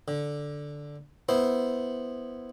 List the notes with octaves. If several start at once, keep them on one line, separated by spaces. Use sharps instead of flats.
D3
B3 E4 C5